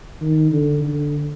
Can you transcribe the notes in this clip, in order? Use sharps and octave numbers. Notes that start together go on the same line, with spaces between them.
D#3
D3
D3